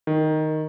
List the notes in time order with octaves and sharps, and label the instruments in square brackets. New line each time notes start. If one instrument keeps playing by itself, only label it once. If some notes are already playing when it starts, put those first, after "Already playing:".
[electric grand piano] D#3